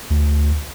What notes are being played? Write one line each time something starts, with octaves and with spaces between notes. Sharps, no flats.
D2